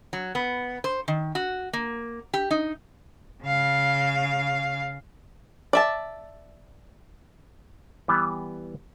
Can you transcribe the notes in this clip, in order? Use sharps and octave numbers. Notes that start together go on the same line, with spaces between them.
F#3
B3
C5
D#3
F#4
A#3
G4
D#4
C#3 F5
D5 E5 A5
E3 G3 B3